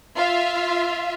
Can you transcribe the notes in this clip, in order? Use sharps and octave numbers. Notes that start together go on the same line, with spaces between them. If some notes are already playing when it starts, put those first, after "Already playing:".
F4 E5 F5